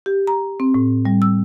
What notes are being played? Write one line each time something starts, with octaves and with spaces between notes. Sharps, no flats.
G4
A#5
C4
A2
G3
E6